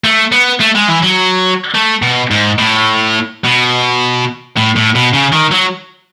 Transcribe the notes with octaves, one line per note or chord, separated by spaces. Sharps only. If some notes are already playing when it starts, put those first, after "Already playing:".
A3
B3
A3
G#3
E3
F#3
A3
B2
G#2
A2
B2
A2
A2
B2
C#3
D#3
F#3